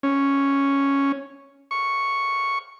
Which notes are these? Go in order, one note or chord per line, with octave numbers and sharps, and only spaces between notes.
C#4
C#6